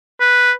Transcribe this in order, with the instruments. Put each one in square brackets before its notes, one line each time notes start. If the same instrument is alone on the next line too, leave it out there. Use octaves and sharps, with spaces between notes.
[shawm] B4